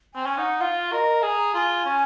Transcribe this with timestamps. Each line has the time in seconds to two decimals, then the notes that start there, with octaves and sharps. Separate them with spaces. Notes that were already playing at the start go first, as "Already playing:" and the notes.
0.14 C4 G#5
0.26 C#4
0.38 D#4 F#5
0.60 F4 F5
0.92 A#4 D#5
1.23 G#4 A#5
1.54 F4 G#5 A#5
1.85 C#4